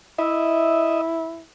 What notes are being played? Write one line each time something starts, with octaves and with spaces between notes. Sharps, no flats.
E4 D#5 E5